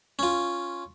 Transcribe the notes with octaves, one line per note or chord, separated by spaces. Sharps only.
C#4 F4